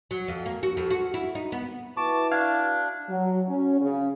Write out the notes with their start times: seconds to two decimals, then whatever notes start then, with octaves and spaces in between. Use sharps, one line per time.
0.11 F#3
0.28 F2
0.46 A#3
0.63 F#4
0.77 F2
0.90 F#4
1.14 E4
1.35 D#4
1.52 B3
1.97 E4 F#4 B4 A5 C#6 D6
2.32 D4 F5 G#6
3.08 F#3
3.48 C#4
3.80 C#3